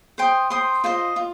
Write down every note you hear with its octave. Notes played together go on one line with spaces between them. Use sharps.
C5 G5 C6 D#6
C5 G5 C6 D#6
F4 C5 D#5
F4